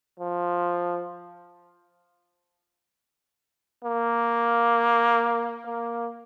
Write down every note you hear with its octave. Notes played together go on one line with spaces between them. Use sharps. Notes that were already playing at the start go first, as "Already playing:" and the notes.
F3
A#3
A#3